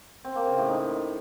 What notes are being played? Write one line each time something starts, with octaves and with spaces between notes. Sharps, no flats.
C4
A#3
C#3
A2
D#4